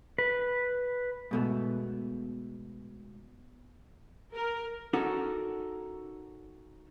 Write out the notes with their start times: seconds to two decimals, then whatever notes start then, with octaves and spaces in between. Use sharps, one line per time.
0.18 B4
1.31 G#2 B2 A3
4.34 A#4
4.93 C#4 D#4 F#4 A4 A#4